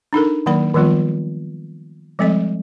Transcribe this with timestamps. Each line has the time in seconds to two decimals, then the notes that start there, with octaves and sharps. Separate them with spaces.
0.13 D4 D#4 A4 A#4
0.46 D#3 F#3 A#3 D5 B5
0.74 D#3 F3 G3 B3 F4
2.19 F3 G3 G#3 C4 A4 D#5